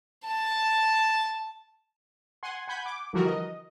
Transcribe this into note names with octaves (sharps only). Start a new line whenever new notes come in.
A5
F#5 G#5 C6
F#5 G#5 B5 G6
D6
D3 E3 F3 G3 F#4 A#4
D#5